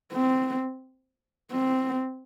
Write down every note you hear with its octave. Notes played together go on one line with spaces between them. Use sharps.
C4
C4